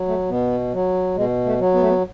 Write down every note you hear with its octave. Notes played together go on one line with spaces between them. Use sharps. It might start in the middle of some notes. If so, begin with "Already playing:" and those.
Already playing: F#3
A3
B2 B3
F#3
B2 G#3
A3
F#3
B3
A3
B3